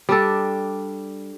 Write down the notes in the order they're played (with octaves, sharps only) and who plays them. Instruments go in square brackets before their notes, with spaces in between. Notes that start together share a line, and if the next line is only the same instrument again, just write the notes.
[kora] G3 D4 A4